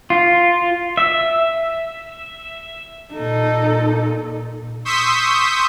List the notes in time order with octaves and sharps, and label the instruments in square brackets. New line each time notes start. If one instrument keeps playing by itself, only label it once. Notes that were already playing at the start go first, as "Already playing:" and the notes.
[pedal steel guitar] F4
E5
[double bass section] A#2 [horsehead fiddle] D#4 A4
[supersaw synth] C6 C#6 D#6 E6 G6 B6